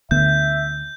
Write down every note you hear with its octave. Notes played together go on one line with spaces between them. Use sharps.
D2 D3 B3 E5 G6